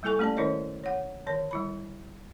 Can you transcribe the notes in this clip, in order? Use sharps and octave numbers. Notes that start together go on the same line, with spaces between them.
G3 A#3 E4 A4 G#5 C#6
A3 C#4 G4 D5 A5
D#3 C#4 E4 A#4 C#5 D#5
C#5 F#5
D3 D#3 C#5
G3 E4 B5